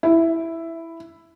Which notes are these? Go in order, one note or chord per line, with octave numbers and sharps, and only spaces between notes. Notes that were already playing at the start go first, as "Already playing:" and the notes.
E4